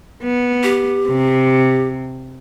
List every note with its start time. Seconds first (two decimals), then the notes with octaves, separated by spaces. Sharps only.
0.24 B3
0.63 G4
1.08 C3